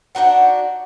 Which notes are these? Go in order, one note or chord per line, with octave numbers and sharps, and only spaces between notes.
D4 D#4 F#4 F#5